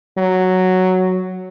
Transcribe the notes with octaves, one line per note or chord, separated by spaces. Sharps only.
F#3